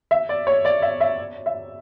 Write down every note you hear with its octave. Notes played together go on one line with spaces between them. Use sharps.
E5
D5
C#5
D5
E5
E5
E5